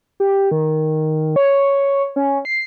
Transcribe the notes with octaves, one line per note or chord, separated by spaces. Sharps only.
G4
D#3
C#5
C#4
C7